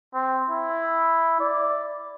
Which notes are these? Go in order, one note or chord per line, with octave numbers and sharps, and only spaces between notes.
C4
E4
D5